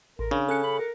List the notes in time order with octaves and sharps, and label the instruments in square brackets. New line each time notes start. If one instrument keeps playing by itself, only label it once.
[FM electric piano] A1 [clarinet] A#4
[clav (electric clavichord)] C#3 [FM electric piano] D4
[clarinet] C#4 [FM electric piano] A4 F#6 C#7
[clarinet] B5
A#4